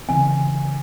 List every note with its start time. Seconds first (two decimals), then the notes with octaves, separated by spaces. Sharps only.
0.09 C#3 E3 C4 G#5